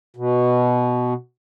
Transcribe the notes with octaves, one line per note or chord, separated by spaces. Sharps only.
B2